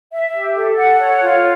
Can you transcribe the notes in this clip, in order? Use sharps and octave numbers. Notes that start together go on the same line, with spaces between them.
E5
G4
A4
F#5
C#5
F4